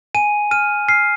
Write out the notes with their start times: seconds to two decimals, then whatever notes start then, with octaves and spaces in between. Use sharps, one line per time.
0.15 G#5 D#7
0.51 F6 D#7
0.88 F6 C7